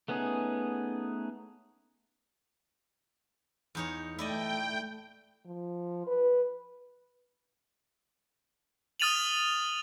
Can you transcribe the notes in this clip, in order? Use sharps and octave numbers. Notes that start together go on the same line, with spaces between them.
A3 B3 C#4 D#4 G#4
E2 D#4 C#5
A3 E4 D5 D#5 G5
F3
B4
D#6 F6 A6 D#7 F7 F#7